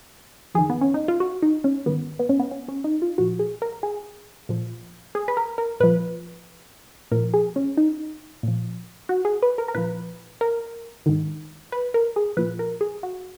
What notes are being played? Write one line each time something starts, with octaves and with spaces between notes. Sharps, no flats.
F2 D#3 G#4
B3
C#4
D#4
F4
F#4
D#4
C#4
G#2 D#3 B3
B3
C#4
B3
C#4
C#4
D#4
F4
A#2 F3 F#4
G#4
A#4
G#4
A#2 F3
G#4
B4
A#4
A#4
A#2 F3 B4
A#2 F3 A#4
G#4
C#4
D#4
A#2 F3
F#4
G#4
B4
A#4
A#4
A#2 F3 B4
A#4
G#2 D#3
B4
A#4
G#4
A#2 F3 B4
A#4
G#4
F#4